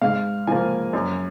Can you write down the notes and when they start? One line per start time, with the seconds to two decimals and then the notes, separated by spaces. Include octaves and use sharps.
0.02 G#2 F5
0.47 F3 A#3 G#5
0.93 F#2